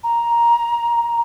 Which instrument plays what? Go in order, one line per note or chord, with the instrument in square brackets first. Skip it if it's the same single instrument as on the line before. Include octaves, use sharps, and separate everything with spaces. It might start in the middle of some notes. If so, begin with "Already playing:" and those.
[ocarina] A#5